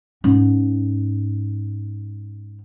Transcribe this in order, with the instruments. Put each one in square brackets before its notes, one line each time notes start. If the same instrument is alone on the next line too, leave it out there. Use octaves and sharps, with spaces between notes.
[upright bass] G#2 C#4